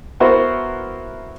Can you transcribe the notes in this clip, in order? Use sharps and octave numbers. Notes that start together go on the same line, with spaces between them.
B3 E4 F#4 A#4 C5